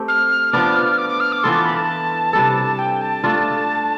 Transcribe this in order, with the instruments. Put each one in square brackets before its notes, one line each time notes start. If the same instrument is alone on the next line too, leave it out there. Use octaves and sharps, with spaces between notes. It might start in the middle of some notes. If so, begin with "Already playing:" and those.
Already playing: [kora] A3 C4 G4
[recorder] F6
[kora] F3 B3 D4 [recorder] D6
[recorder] F6
D6
D6
F6
D6
[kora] E3 B3 F4 A4 [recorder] C6
[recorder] D6
B5
A5
[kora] C3 G3 D4 A4
[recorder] G5
A5
[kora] A3 D4 F4